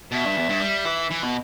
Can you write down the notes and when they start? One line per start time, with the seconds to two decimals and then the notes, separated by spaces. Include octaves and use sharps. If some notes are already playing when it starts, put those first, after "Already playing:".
0.12 B2 E5
0.24 G2
0.37 E2
0.49 G2
0.60 G3
0.85 E3
1.11 E3
1.23 B2